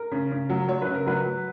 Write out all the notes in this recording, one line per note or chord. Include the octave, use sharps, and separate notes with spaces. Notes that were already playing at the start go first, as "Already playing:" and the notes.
Already playing: A#4
C#3
C#3
F#3
F#3 C#5
B4
C#3
A#4
F#3 B4
F#3